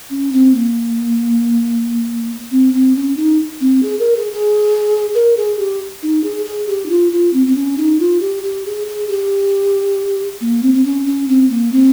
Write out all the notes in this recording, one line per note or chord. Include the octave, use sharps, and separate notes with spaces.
C#4
C4
A#3
C4
C4
C#4
D#4
C4
G#4
A#4
G#4
G#4
A#4
G#4
G4
D#4
G#4
G#4
G4
D#4
F4
F4
C4
C4
C#4
D#4
F4
G4
G4
G#4
G#4
G4
A#3
C4
C4
C#4
C#4
C4
A#3
C4